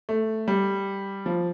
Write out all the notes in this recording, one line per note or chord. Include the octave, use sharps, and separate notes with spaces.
A3
G3
F3